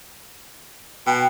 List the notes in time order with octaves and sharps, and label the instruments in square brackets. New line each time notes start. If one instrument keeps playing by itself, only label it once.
[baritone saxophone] B2 [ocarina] G5